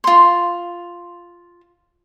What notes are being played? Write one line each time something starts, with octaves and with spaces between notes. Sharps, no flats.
F4 C6